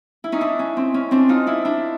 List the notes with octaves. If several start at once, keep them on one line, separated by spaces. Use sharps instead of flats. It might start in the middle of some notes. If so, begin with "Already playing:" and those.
E4
C#4 D#4
D4 E4
C#4
C4
C#4
C4 D4
D#4 F4
D4 E4
D4 E4